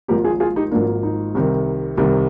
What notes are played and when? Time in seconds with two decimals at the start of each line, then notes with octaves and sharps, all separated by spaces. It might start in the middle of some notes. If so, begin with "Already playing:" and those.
0.08 G#1 G#2 F3 A#3 G4 A#4
0.24 F4 G#4
0.40 F4 G#4
0.56 D#4 G4
0.71 G#1 G#2 F3 A#3 D4
1.03 D#4
1.35 C2 C3 D#3
1.97 C2 C3 D#3